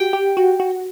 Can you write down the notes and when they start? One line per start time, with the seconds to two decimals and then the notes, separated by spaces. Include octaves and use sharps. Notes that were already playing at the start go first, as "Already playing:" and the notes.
Already playing: F#4 G4 G5
0.13 G4
0.37 F#4
0.60 F#4